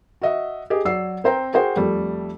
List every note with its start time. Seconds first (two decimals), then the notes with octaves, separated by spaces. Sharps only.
0.22 F#4 D#5 E5
0.70 G4 G#4 D#5
0.85 F#3 D5 E6 C7
1.24 C4 C5 G5 A#5
1.53 F#4 G#4 A#4 C5 G5
1.76 F2 G3 A3